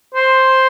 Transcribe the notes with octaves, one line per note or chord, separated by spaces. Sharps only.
C5